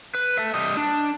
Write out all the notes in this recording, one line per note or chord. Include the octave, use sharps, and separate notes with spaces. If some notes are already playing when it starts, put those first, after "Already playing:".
B4
A4 E5
G3 D#5
D4